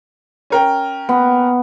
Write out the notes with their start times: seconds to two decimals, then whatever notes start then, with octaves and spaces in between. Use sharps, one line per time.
0.50 C#4 A#4 G5
1.09 B3